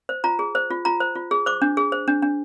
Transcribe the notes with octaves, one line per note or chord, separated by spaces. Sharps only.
C5
F4 A#5
G#4
C5
F4
F4 A#5
C5
F4
G#4
C5 D6
D4
G#4
C5
D4
D4